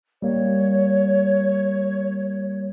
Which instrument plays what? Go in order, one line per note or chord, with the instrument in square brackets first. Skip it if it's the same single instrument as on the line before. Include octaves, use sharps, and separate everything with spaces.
[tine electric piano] G3 A#3 [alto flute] C#5